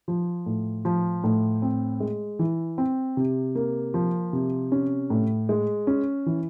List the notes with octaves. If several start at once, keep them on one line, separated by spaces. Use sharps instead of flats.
F3
A2
F3
A2
C4
G#3
E3
C4
C3
A#3
F3
C3
C#4
A2
G#3
C#4
E3